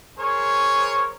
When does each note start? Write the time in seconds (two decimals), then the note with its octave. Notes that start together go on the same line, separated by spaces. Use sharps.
0.18 G#4 A#4 C5 C#5